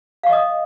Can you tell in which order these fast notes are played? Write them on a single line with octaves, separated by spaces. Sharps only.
F5 C#6 D#5 D#6